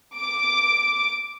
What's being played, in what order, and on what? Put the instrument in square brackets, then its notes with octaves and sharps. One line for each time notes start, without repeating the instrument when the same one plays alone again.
[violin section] D6